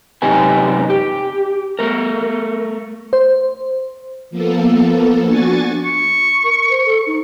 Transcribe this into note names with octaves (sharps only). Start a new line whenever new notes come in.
F#2 C3 D#4 G4 B4 G#5
G4
A3 A#4
C5
F3 A#3 B3 A4
D4 F#4 G#5 C#6 A6
C#6
A#4
C5
A4
D#4